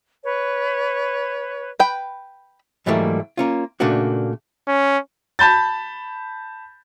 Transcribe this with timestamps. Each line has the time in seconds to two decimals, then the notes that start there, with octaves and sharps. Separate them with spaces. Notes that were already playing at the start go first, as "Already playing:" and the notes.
0.24 B4 C#5
1.79 B4 G5
2.86 G#2 E3 F#3 G3 A3 A#3
3.37 A#3 C#4 F4
3.80 A#2 C#3 A3 A#3 D4 F#4
4.68 C#4
5.39 A5 B5 G6 A6